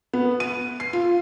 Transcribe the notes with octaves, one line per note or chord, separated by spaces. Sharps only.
B3
D#7
C7
F4